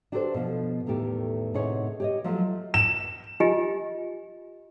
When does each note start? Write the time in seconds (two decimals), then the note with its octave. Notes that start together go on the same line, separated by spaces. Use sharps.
0.12 D4 F#4 G4 A4 B4 C5
0.34 B2 F3
0.86 E2 A2 D#3 A3 G4
1.54 A2 C3 D#4 G#4 C#5 F#5
2.00 G4 C#5 D#5
2.24 F3 F#3 A3 F4 D#5
2.74 E7
3.40 F4 G4 D#5 G#5